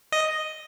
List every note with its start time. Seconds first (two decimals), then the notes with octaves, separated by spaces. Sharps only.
0.12 D#5